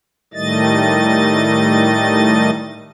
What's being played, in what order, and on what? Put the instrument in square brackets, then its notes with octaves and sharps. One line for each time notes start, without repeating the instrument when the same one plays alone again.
[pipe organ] A2 D#3 G3 A3 D#5 A6